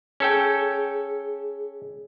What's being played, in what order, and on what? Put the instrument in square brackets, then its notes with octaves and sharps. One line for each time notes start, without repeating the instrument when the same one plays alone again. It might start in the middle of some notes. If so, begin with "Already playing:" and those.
[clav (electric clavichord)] C#4 A4 G5 [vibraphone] G#4